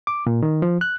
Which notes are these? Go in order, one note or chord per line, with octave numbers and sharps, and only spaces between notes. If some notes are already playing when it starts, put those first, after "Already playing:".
D6
A#2
D#3
F3
F#6